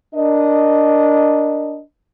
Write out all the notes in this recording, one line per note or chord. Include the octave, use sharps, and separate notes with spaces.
D4 A#4 D#5